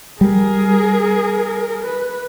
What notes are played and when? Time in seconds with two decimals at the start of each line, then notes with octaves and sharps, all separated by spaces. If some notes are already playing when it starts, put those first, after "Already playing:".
0.21 G3 G#4 A#4
1.83 B4